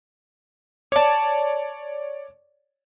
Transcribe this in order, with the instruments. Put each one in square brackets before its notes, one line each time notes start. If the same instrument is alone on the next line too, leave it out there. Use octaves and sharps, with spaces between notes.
[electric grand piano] C#5 D5 [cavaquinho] A5 D6